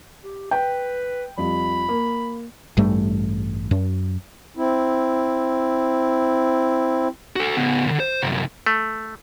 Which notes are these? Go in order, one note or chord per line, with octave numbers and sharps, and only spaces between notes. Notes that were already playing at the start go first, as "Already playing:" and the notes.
G4
B4 G5
F2 G3 F4 B5
A#3
A1 G2 G3 A3
F#2
C4 E4
F#4 A4
C#3 B3
C2 D3
C5
C2 F#2
A3